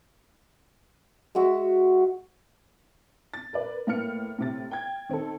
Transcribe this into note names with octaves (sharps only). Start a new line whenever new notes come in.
G#3 F#4 E5
A6
A#4 B4 D5
A2 A#3 B3 F6 C#7
A2 C3 A6
G5 G#6
D#3 C4 D#4 A4